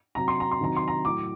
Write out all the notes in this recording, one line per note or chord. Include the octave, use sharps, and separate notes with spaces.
C3 F#3 A#5
C6
A#5
C6
C3 D#3 F#3 A#5
C6
A#5
A2 F#3 D6